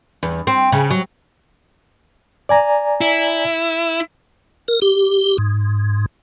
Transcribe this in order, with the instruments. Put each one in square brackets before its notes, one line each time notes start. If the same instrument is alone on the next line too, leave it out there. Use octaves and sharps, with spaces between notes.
[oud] E2
C4
C#3
F#3
[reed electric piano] D5 G#5 A#5
[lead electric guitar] E4
[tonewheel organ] A#4
G4
G#2